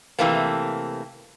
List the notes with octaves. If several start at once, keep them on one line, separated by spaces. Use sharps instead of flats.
C3 E3 A3 A#3